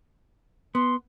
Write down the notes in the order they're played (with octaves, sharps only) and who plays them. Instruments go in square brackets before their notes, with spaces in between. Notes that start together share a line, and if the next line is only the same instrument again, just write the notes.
[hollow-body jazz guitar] B3 [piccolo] C6